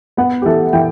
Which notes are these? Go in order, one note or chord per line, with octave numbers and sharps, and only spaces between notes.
B3 F#5
G4
E3 A4
E3 G5